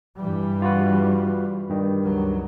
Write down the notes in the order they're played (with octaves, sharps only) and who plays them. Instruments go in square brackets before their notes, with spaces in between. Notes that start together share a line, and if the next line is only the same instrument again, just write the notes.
[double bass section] G2 E3 G3
[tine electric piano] F4 F#4 B4
G2 D#3 G3
[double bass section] C#2 F#3